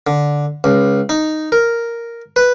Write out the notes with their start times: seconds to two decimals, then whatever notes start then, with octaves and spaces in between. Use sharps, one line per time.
0.07 D3
0.64 C#2
1.09 D#4
1.52 A#4
2.36 B4